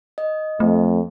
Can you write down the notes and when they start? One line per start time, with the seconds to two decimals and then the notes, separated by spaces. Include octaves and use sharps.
0.18 D#5
0.60 F2 A3